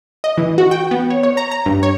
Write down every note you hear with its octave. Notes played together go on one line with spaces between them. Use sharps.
D#5
E3
F#4
G5
B3
C#5
C#5
A#5
A#5
G2
C#5